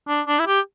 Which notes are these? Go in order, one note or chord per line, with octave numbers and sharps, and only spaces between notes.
D4
D4
E4
G4